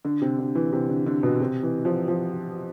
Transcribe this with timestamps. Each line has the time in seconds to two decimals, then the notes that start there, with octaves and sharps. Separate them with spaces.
0.05 D3
0.22 C3
0.38 D3
0.55 E3
0.72 C3
0.89 D3
1.06 D3
1.23 B2
1.40 C3
1.63 E3
1.85 F3
2.08 F3